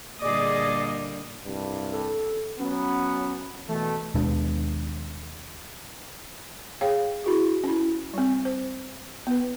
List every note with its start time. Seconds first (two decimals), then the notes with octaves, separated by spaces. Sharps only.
0.21 A#2 D3 G3 G#4 D5 D#5 D6
1.44 C2 G2
1.93 A4
2.59 F#3 B3 C#4
3.68 B2 E3 A3
4.15 D#2 B2 G#3 D4
6.81 G#4 C#5 F5 G5
7.24 E4 F#4 G#4
7.64 C#4 E4
8.14 G3 C4
8.45 C5
9.27 B3 B4